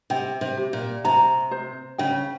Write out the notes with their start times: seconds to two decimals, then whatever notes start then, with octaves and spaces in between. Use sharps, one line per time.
0.10 C3 G5
0.41 C3
0.57 G4
0.73 A#2
1.04 C3 A#5
1.51 C5
1.98 C#3 G5